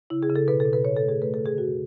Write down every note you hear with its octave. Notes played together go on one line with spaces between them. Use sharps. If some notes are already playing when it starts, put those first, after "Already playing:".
C#3 E4
G#4
C#3
A4
B2 B4
A4
B2
B4
A2 C#5
A4
A3
G#4
A3 B4
D3 A4
G#4
F#2 F#4